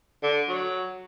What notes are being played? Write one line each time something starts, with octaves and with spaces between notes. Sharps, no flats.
D3
F#3